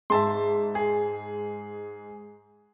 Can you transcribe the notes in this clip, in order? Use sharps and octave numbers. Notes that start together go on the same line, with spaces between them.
G#2 E5 A5 C6
G#4